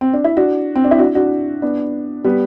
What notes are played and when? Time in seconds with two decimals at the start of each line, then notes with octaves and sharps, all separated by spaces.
0.01 C4
0.13 D4
0.24 E4
0.37 D4 F#4
0.76 C4
0.84 D4
0.91 E4
0.99 D4 F#4
1.15 D4 F#4
1.62 B3 D4
2.24 G3 B3